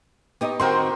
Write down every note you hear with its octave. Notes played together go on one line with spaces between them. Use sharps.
B3 D#4 G4 D#5 C#6
D#3 C4 F#4 A#4 G5 C6 C#6